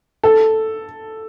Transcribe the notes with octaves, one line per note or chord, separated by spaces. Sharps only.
A4